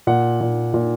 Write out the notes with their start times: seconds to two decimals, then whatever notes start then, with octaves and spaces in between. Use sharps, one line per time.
0.07 A#2 F#5
0.41 A#2
0.74 A#2